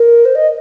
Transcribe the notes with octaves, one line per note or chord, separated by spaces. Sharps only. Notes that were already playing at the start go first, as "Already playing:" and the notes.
Already playing: A#4
C5
D#5